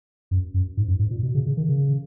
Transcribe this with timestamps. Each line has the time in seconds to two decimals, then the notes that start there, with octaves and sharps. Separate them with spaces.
0.31 F#2
0.54 F#2
0.77 G#2
0.88 F#2
0.99 G#2
1.11 A#2
1.23 B2
1.35 C#3
1.46 C#3
1.57 D#3
1.69 C#3